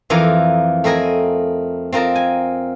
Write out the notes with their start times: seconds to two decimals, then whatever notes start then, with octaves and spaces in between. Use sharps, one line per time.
0.10 F2 E3 F3 F4 A#4 D5
0.84 A3 C4 A#4 D#5 G#5
1.92 C4 F4 A#4 D#5 A5
2.16 G#5